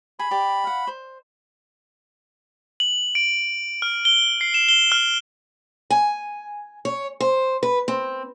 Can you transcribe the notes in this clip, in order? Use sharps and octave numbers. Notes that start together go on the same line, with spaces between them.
G#4 B5
G4 D5
F5 F#5
C5
F#7
D7
F6
G7
C7
E7
G7
F6
G#5
C#5
C5
B4
C4